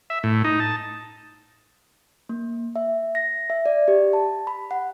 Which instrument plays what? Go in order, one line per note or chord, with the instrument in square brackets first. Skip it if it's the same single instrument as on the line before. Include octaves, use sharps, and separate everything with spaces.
[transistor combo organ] E5
A2
D#4
A5
[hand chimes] A#3
E5
A#6
E5
D5
G4
A5
B5
F#5